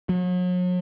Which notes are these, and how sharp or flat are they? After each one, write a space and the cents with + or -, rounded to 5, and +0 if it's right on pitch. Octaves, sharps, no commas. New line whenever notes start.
F#3 -40